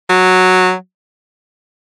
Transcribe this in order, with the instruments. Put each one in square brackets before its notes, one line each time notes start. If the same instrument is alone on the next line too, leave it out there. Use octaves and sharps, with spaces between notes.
[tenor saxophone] F#3